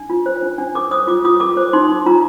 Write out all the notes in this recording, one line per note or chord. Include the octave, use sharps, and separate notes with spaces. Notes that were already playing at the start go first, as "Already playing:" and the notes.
Already playing: D4
F4
C5
D4
D4
A4 D6
C5 D#6
F4 D6
F4 D#6
A4 D6
C5
D#4 C6
D#4
F4 A#5